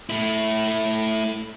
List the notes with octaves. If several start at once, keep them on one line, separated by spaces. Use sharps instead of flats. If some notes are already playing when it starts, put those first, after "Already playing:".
A3 E4